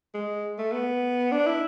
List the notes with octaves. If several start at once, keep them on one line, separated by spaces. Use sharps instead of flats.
G#3
A3
B3
D4
E4